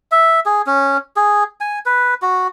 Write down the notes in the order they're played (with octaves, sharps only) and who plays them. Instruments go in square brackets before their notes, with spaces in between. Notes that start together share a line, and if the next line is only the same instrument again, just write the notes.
[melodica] E5
G#4
C#4
G#4
G#5
B4
F#4